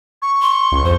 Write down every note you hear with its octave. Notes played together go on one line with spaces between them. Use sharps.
C#6
C6
C#2
F2 C5